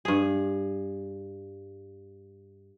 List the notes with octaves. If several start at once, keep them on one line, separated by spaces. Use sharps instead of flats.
G2 G#4